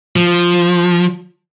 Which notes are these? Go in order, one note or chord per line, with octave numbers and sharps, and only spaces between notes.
F3